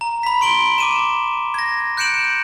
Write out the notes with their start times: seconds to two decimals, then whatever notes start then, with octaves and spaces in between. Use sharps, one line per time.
0.01 A#5
0.23 B5 B6
0.41 C6 D7 F#7 G7
0.78 D6 D#7 E7
1.54 G#6 A#6
1.97 F#6 G6 C#7 D7 E7 F#7